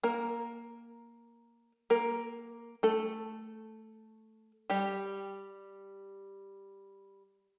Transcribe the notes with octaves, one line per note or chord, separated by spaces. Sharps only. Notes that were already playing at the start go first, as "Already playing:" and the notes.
A#3 A#4
A#3 A#4
A3 A4
G3 G4